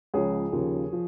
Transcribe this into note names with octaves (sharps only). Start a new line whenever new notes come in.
C#2 C#3 F3 G#4 C#5
D#2 C#3 F3
F3